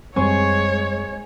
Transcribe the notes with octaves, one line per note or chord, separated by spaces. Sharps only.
F#2 G3 G#3 C4 C5 C#5 G#5 C#6